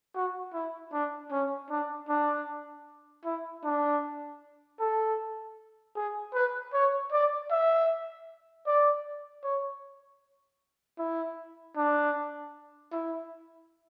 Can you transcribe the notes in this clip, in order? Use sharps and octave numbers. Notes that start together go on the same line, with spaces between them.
F#4
E4
D4
C#4
D4
D4
E4
D4
A4
G#4
B4
C#5
D5
E5
D5
C#5
E4
D4
E4